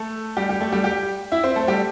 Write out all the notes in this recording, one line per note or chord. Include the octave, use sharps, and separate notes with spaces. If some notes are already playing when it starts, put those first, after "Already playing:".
Already playing: A3 A4
G3 G4
G3 G4
A3 A4
G3 G4
G4 G5
E4 E5
C4 C5
A3 A4
G3 G4